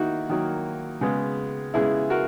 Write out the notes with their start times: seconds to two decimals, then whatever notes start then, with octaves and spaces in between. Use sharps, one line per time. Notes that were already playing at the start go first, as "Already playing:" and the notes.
Already playing: D#3 A#3 D#4 E4 F#4
0.29 D#3 F#3 A#3
1.01 C#3 G#3 B3
1.74 C#3 G#3 B3 E4 G#4
2.10 F#4 A#4